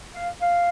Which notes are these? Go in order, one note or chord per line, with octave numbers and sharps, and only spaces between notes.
F5
F5